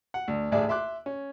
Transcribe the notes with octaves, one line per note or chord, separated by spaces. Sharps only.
F#5
D2
A1 D2 G#4 D5 E5
E5 C6 D6 F#6
C#4